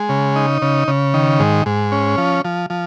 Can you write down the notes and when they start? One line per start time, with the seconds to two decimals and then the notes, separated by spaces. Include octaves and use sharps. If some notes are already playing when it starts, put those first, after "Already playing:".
Already playing: G#3
0.09 C#3
0.36 D#4
0.62 C#3
0.88 C#3
1.14 D#3
1.40 G#2
1.66 G#2
1.92 C#4
2.18 F3
2.45 F3
2.70 F3